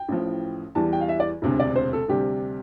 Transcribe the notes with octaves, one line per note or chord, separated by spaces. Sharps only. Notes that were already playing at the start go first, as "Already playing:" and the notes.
Already playing: G5
A1 A2 F3
E2 E3 G3 A5
G5
F5
E5
D5
E1 D2 C3
D5
C5
A4
D2 C3 G3 G4